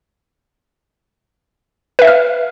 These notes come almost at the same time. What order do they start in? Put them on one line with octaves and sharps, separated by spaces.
B4 E5 F5 F6